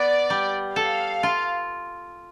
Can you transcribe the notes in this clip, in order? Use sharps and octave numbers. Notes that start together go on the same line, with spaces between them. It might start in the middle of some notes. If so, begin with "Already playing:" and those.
Already playing: B3 D5
G3
A4 F5
F4